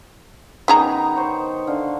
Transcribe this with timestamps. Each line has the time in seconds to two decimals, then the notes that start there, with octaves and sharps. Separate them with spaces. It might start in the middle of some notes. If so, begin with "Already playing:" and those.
0.68 D#3 B3 C#4 D#4 G#4 A#5
1.16 C5 C#5
1.67 D3 F5